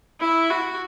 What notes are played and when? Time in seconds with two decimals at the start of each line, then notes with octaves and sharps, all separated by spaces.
0.21 E4
0.50 F#4